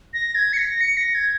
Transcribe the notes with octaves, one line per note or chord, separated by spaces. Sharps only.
A#6
G#6
C#7
A#6
C#7
A#6
G#6